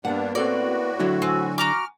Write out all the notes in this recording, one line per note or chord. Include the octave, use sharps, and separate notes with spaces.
G2 G3 A#3 B3 D4 F#5
A2 C4 F#4 A4 A#4 D5
D3 F#3 E4
C4 G#5
F#4 A#5 D6 F6